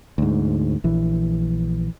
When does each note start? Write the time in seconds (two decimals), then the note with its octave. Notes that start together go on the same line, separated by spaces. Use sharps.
0.18 D2 G#2
0.84 A#1 E3